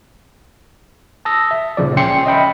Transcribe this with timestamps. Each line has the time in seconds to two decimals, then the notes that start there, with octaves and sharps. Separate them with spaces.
1.25 A5 D#6 E6 A#6
1.51 E5
1.77 D2 A#2 C#3 F3 D5
1.97 C#2 C#4 G5 C6 C7 C#7
2.26 D#5 E5 G5 B5